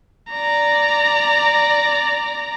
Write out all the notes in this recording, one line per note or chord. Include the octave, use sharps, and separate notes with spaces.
D5 A#5